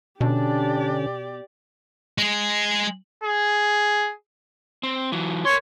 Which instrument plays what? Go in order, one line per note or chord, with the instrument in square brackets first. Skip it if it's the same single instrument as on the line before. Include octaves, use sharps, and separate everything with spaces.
[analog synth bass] B2 [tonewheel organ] D3 C#4 [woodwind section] D4 [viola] G4 D5
[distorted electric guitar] G#3 G#4
[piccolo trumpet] G#4
[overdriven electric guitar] C4
E3 F#3
[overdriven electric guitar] A#4 C6 [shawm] C#5